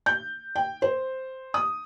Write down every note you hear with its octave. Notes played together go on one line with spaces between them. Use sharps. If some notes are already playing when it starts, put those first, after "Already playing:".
G6
G5
C5
D#6